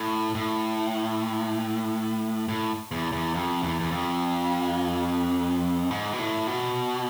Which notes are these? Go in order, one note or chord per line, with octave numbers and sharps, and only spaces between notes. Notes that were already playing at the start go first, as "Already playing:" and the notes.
Already playing: A2
A2
A2
E2
E2
F2
E2
E2
F2
G#2
B2
A2
B2